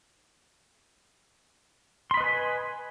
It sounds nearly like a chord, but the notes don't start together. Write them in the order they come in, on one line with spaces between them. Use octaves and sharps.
C6 B5 D#5 B4 G#5